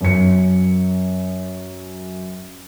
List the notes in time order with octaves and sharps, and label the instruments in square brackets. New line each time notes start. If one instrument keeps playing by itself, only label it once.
[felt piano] F#2 C#7